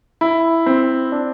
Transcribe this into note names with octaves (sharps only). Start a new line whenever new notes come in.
E4
C4
D4